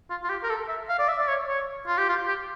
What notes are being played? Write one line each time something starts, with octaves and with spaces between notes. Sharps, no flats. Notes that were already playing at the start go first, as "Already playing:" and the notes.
F4
F4
G4
A#4
A4
E5
F5
D5
E5
D5
C#5
C#5
F4
G4
F4
G4